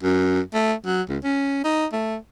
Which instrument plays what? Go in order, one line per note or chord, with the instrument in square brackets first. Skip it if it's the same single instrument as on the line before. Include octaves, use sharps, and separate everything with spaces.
[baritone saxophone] F#2
A3
F#3
C#2
C#4
D#4
A3